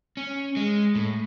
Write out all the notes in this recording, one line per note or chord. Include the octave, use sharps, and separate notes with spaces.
C#4
G#3
A2